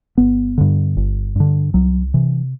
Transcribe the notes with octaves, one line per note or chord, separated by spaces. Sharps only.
G1 B3
G2 D3
G1
G2 D3
C2 F#3
C3 E3